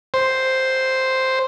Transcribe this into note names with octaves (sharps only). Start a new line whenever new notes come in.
C5